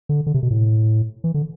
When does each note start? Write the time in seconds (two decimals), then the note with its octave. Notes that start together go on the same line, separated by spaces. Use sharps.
0.09 D3
0.27 D3
0.34 C3
0.43 B2
0.51 A2
1.24 E3
1.34 D3